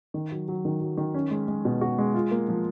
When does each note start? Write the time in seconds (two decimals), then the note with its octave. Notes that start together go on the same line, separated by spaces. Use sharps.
0.14 D#3
0.32 F#3
0.48 F#3
0.65 D#3
0.81 F#3
0.97 D#3
1.14 C#4
1.31 G#3
1.48 G#3
1.65 B2
1.81 F#4
1.98 G#3
2.14 F4
2.31 A#3
2.49 F3